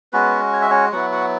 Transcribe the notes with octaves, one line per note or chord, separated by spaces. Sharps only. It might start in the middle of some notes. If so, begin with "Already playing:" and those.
G#3 B3 C#4 F#4 B4
C#5
E5
C#4 C#5
F#3 B3 E4 F#4 F#5
F#4 F#5